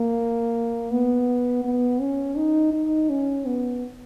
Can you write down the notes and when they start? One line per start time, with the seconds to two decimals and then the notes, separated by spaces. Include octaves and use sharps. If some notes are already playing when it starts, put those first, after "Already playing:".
Already playing: A#3
0.91 B3
1.65 B3
2.01 C#4
2.37 D#4
2.73 D#4
3.10 C#4
3.46 B3